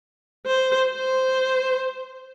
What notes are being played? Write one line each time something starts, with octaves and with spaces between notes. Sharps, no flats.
C5
C5